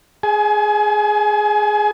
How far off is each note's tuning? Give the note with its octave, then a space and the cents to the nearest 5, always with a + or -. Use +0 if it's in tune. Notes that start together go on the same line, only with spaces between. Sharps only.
G#4 +0 G#5 +35